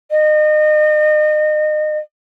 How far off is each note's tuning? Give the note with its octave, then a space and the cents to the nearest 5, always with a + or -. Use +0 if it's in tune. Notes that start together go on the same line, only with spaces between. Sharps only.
D#5 -30